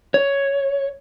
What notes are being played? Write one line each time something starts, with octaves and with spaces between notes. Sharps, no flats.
C#5